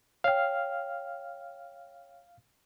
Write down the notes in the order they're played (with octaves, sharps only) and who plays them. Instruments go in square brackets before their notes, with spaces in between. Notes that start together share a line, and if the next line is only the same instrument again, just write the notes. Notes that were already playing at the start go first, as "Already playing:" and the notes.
[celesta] C#5 G5 [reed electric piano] F5 F6